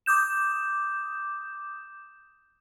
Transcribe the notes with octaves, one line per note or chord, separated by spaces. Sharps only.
D6 D#6 G6 E7